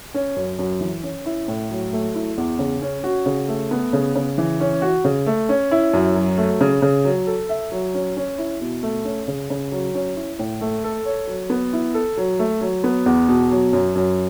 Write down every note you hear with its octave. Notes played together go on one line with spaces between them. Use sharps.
C#4
F#2
F#2
E3
C#4
E4
A2
F#3
A3
E4
E2
C#3
C#4
F#4
C#3
A3
B3
C#3
C#3
E3
C#4
F#4
C#3
A3
C#4
E4
F#2
F#3
A3
C#3
C#3
F#3
A4
E5
F#3
C#4
C#4
E4
B2
A3
C#4
C#3
C#3
F#3
C#4
E4
A2
A3
A4
C#5
F#3
B3
E4
A4
F#3
A3
F#3
B3
E2
B2
F#3
F#2
F#2